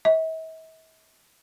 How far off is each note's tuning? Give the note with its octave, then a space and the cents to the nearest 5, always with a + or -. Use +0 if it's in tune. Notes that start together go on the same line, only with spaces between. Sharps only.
E5 -45